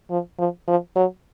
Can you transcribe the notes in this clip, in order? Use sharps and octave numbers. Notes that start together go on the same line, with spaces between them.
F3
F3
F3
F#3